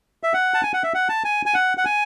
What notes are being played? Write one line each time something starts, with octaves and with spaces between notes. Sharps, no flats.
E5
F#5
A5
G#5
F#5
E5
F#5
A5
G#5
G#5
F#5
F#5
G#5